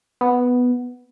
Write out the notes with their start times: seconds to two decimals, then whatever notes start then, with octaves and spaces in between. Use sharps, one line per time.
0.21 B3